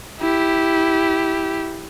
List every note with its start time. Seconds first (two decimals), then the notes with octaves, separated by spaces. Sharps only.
0.20 E4 G4